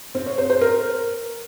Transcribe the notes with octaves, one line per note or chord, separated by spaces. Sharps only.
C4
C#5
C5
C5
A#4